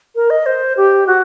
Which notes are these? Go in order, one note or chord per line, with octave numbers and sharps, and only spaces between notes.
A#4
D#5
C5
G4
F#4